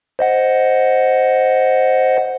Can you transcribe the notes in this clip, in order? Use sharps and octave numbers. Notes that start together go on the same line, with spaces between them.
C5 D#5 F#5